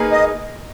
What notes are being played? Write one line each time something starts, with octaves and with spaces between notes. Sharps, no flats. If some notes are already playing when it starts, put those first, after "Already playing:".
Already playing: A#3 D#4 G#4 B4
D#5